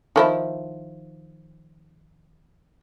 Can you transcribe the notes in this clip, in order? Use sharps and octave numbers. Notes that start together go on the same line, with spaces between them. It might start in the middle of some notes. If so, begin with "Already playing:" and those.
D#3 F3 E4